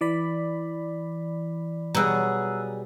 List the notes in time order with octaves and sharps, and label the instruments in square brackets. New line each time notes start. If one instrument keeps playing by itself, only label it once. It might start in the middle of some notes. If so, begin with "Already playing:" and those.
[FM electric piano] E3 D5 B5
[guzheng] B2 F#3 [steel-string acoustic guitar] G3 G#4 [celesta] A#5 E6 F#6